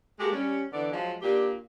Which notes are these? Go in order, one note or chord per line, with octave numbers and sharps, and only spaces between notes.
G#3 A#3 F#4 G4 A4
G3 C#4
D3 E3 B3 D5
F3 F#3 G#3
A#2 A#3 D4 G4